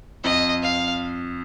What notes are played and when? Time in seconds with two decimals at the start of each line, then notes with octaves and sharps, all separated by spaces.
0.24 F2 D#5
0.63 F5